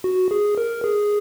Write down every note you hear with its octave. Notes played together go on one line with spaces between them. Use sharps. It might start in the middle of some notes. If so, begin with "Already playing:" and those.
F#4
G#4
A#4
G#4